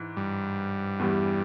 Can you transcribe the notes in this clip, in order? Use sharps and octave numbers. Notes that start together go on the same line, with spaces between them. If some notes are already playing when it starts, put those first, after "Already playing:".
Already playing: G#2 E3
G2
E2 E3 G3